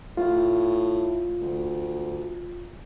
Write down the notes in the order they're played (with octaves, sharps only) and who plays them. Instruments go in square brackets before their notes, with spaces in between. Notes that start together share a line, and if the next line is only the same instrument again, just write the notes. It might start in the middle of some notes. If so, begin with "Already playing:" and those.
[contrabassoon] A2 [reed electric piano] F4
[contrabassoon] D2